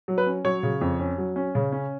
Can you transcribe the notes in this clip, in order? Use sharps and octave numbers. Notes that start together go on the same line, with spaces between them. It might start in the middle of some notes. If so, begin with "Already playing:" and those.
F#3
B4
C#4
F#3 C#5
C#3
F2
C#4
F#3
C#4
C#3
C#4